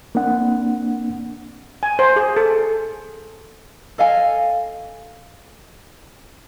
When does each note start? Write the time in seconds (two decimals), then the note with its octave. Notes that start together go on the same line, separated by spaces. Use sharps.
0.15 A#3 C4 D4 F#5
1.83 G#5
1.99 C5
2.16 G#4
2.37 A4
3.98 A4 D#5 F5 G#5